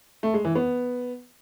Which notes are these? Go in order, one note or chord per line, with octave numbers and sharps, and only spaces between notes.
A3
G#3
E3
B3